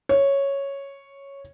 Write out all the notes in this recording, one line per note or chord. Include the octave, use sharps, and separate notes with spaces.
C#5